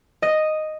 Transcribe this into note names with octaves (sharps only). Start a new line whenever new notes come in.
D#5